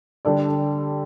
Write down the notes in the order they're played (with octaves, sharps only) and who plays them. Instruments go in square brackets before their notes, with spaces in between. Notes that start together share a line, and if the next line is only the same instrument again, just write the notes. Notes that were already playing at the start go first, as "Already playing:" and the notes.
[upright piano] D3 G3 D4 A4 D5